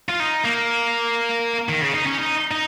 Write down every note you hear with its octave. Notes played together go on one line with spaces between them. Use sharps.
F4
D#4
A#3
D#3
C#3
D#4
C#4
D#4
D#4